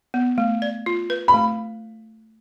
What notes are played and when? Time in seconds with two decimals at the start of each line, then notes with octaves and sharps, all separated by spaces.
0.14 B3
0.38 A3
0.62 D5
0.86 F4
1.10 B4
1.28 B5
1.34 A3